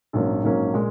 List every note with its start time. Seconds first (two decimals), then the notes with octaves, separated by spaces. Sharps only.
0.13 A#1 G#2 F#3 A#3 C#4
0.44 A#1 G#2 F#3 A#3 C#4
0.74 A#2 G#3